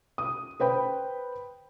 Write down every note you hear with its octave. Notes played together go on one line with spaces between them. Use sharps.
D#6
B4 C5 G5 B5